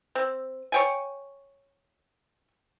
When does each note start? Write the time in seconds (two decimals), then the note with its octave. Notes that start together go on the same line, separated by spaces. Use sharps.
0.15 C4
0.72 C#5 G5 G#5